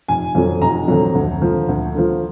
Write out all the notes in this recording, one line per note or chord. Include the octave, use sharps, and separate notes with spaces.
F1 G#5
F2 D3 F#3
F1 A#5
F2 D3 F#3
D2
D3 F3
D2
D3 F3